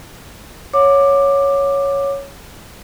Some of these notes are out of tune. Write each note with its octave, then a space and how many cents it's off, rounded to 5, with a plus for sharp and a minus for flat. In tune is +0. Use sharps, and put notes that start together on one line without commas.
C#5 +0 F#5 -45 D6 +10